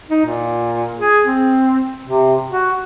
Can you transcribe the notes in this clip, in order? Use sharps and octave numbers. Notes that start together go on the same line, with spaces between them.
D#4
A#2
G#4
C4
C3
F#4